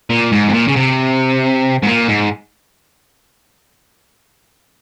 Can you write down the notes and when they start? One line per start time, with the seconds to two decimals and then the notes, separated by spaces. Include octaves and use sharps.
0.10 A#2
0.32 G#2
0.49 C3
0.53 A#2
0.68 C#3
0.76 C3
1.82 G#2
1.87 A#2
2.08 G#2